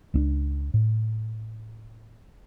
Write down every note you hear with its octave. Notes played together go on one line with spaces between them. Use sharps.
C#2 C4 D4
A2